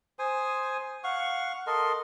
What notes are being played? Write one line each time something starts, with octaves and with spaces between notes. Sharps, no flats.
C5 G#5 D#6
F5 F#5 C#6
A4 A#4 D#5 C6